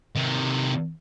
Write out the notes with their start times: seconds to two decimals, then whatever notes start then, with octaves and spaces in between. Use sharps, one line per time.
0.16 C3 D#3